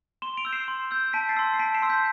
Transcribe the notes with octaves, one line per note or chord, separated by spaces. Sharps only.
C6 E7 G7
D7 F7
E6 G6
C7 E7
C6
E6 G6
A5 B6 D7
A6 C7
C6 E6
C7
A5 B6 D7
C7 E7
C6 E6
G6 B6